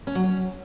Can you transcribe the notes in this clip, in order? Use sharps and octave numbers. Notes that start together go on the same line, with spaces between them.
C#4
F#3
C#4